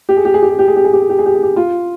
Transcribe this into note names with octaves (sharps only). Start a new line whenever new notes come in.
G4
G#4
G4
G#4
G4
G#4
G4
G#4
G4
G#4
G4
G#4
G4
G#4
G4
G#4
G4
F4